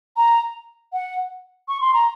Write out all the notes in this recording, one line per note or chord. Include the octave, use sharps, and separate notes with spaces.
A#5
F#5
C#6
C6
A#5